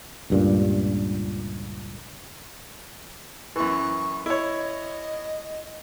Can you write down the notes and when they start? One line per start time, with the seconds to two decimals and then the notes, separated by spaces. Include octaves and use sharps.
0.30 C#2 G2 A#2
3.56 F#2 E3 C#6
4.26 E4 C#5 D#5